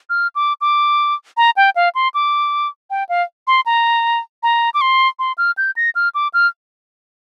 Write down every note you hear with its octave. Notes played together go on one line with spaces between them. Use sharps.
F6
D6
D6
A#5
G5
F5
C6
D6
G5
F5
C6
A#5
A#5
D6
C6
C6
F6
G6
A#6
F6
D6
F6